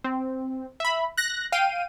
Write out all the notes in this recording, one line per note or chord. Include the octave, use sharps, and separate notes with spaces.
C4
E5 B5
F#6 A#6
F5 G5 D#7